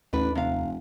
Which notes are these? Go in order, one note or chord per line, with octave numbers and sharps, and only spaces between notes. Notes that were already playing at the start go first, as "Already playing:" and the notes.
A1 D#2 D4 B4
F1 C3 F5